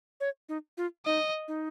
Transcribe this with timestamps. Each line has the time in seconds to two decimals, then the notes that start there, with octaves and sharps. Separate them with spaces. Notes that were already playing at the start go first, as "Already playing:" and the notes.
0.21 C#5
0.49 D#4
0.77 F4
1.06 D#4 D#5
1.48 D#4